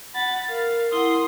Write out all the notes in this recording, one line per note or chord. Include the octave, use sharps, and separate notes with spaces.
F#5 B5 A6
A#4 F5
E4 F#5 C6 D#6